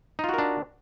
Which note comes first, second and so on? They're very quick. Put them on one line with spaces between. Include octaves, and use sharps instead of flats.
D#4 F4 F#4 A#4 D4